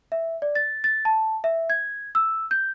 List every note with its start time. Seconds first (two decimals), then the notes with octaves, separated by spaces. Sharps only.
0.12 E5
0.42 D5
0.55 A6
0.84 A6
1.05 A5
1.44 E5
1.70 G#6
2.15 E6
2.51 G6